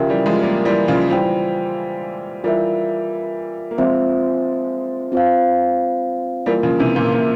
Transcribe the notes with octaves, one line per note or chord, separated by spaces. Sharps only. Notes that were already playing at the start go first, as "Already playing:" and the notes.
Already playing: C#3 F3 G4 A#4 E5 G5
E3 G3
F3 G#3
G3 A#3
E3 G3
C#3 F3
E3 G3 F4 C5 G5
E3 G3 F4 A#4 E5
A#3
F3 G#3 C4 F4 C5 E5
C4 F4 C5 F5
E3 G3 A#3 F4 A#4
C#3 F3
C3 E3
A#2 C#3
A#2